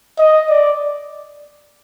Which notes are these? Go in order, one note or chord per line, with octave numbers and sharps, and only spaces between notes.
D#5
D5